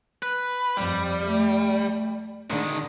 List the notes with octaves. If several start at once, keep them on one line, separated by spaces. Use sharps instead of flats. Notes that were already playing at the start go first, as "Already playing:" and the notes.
B4
F2 G3
A3
D3 D#3 G#3